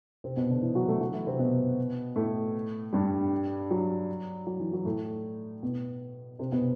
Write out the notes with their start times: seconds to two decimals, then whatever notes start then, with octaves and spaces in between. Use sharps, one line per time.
0.24 C3 C4
0.36 B2 B3
0.50 D3 D4
0.62 E3 E4
0.75 F#3 F#4
0.88 A3 A4
1.01 F#3 F#4
1.14 E3 E4
1.27 C3 C4
1.39 B2 B3
2.16 A2 A3
2.93 G2 G3
3.71 F#3
4.47 F#3
4.60 E3
4.73 F#3
4.85 A2 A3
5.63 B2 B3
6.39 C3 C4
6.52 B2 B3